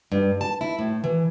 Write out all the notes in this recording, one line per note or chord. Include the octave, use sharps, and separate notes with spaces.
G2
A5
E4
A2
E3